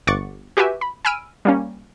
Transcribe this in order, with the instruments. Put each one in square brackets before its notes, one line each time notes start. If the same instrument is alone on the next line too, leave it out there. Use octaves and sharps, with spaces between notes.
[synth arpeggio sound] G1 F#5 C#6 D6 A6 C#7
F#4 G4 B4 E5 G#5
B5
G#5 B5 E6 F6 D7 D#7
G3 A#3 C#4